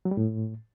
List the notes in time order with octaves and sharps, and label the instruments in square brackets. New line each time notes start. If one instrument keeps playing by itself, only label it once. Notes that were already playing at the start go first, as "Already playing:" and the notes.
[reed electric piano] F#3
G3
A2